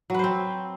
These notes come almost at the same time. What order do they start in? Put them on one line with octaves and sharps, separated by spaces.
F#3 B4 C5 C4